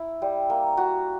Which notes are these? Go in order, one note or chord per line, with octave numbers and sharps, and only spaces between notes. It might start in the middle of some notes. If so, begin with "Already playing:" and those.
Already playing: E4
G3
A#3
F#4